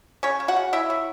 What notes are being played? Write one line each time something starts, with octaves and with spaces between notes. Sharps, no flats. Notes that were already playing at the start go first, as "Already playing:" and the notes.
C#3 C#4 C#5
C#3
F#4 F#5
C#3
C#3 E4 E5
F#3